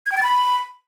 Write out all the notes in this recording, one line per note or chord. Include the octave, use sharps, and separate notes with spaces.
G#6
G5
A6
B5